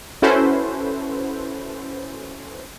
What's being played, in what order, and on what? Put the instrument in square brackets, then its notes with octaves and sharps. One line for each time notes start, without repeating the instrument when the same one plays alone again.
[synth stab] C#4 E4 F#4 A4 B4 C5